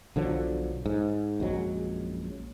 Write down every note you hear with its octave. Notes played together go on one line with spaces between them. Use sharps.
B1 D3 F3 F#3
G#2
A#1 F#2 F#3 G#3